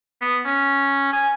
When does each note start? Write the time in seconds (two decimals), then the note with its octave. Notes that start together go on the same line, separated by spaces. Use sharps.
0.21 B3
0.45 C#4
1.13 G#5